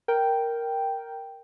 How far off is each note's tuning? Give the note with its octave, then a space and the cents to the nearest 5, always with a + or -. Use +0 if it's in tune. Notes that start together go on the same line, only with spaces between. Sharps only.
A#4 +0 G5 -5